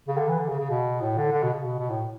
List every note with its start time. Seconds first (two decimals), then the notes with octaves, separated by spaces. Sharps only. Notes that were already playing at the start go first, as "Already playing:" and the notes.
0.08 C#3
0.18 D3
0.28 E3
0.39 D3
0.49 C#3
0.59 C#3
0.70 B2
1.01 A2
1.17 D3
1.32 D3
1.43 B2
1.53 C#3
1.63 B2
1.79 B2
1.90 A2